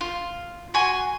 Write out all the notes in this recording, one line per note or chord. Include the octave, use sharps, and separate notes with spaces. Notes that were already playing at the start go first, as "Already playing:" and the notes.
F4
F#4 G#5 C6